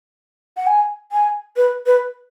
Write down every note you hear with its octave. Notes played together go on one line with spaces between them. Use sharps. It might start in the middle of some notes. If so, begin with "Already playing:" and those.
F#5
G#5
G#5
B4
B4